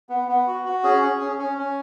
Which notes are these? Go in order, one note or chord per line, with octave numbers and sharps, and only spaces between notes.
B3
B3
F#4
F#4
C#4 G#4
C#4
C#4
C#4
C#4